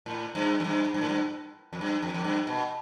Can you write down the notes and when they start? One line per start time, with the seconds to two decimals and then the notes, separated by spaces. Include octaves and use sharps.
0.06 A2
0.35 G2
0.60 F2
0.64 G2
0.94 G2
1.01 A2
1.09 G2
1.73 F2
1.81 G2
2.02 F2
2.14 F2
2.24 G2
2.47 B2